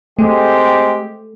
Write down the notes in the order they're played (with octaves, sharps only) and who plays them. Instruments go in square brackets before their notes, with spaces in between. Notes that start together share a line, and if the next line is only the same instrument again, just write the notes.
[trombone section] G#3 C4 G4 [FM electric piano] A3